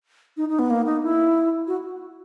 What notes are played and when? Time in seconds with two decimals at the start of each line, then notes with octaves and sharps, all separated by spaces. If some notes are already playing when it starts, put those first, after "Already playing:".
0.37 D#4
0.49 D#4
0.59 B3
0.70 A#3
0.86 D#4
1.03 E4
1.67 F#4